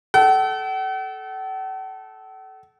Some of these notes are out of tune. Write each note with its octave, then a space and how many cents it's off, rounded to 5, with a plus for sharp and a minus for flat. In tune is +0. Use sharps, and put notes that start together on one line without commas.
A4 -20 F#5 +45